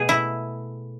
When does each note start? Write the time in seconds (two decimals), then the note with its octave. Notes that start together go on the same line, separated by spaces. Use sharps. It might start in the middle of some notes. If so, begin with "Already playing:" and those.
Already playing: B2 A3 G#4
0.09 E4